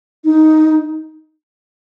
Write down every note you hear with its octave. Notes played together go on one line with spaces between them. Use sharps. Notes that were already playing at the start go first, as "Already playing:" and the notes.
D#4